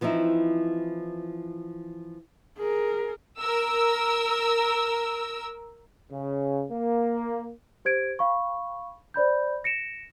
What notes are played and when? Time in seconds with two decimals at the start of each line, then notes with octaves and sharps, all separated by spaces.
0.01 E3 F3 C4 D#4 E4
2.57 G#4 A#4
3.41 A#4 E6
6.11 C#3
6.71 A#3
7.85 G4 C5 G#6 D7
8.19 F5 B5 C#6
9.14 C5 D5 B5 G6
9.64 A#6 C#7 D7 E7